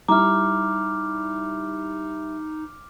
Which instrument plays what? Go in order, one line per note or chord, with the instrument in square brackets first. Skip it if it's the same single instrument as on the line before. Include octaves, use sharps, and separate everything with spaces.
[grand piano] G3 E4 [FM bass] D#4 [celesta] A#5 [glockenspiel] D6 F6